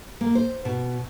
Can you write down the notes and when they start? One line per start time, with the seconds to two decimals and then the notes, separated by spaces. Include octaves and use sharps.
0.21 A#3
0.35 C5
0.65 B2